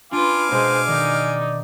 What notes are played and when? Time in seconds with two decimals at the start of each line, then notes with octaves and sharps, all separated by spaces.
0.12 D4 F4 B4 F5 G#5 D6
0.51 B2 G#3 C5
0.88 D#3 D#4 D5